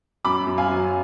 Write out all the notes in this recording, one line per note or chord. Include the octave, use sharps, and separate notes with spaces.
F#2 B5 D6
F#2
F5 G#5
F#3